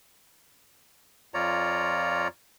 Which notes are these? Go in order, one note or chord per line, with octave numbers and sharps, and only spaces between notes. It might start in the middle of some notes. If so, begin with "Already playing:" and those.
F2 F4 C#5 D5 A#5